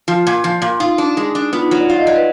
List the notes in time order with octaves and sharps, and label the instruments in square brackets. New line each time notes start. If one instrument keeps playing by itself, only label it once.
[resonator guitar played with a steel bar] F3 [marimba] F4
[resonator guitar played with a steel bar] A#2
F3
A#2
[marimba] D#4 [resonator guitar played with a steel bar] F4
[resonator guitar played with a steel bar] D4
G#3
D4
[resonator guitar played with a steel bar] B3 [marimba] F4
[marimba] D#4
[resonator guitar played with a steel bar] F#3 [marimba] F4
[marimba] D5
[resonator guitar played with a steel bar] F4 [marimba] F5
[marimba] D#5
[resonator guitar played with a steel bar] F#3 [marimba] D5
[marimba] B4